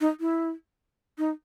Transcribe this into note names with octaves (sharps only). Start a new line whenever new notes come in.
D#4
E4
D#4